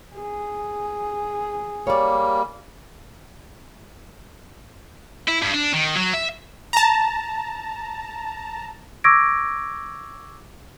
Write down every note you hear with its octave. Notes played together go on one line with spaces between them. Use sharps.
G#4
G3 A#3 C#5 D5
E4
G2
D4
D#3
F#3
E5
A5 A#5
C#6 D6 E6 G#6 A#6 D7